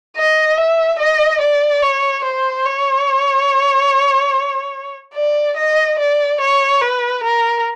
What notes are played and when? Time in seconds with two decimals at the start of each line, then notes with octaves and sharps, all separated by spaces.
0.16 D#5
0.57 E5
0.99 D#5
1.41 D5
1.82 C#5
2.24 C5
2.65 C#5
5.15 D5
5.57 D#5
5.99 D5
6.41 C#5
6.81 B4
7.24 A#4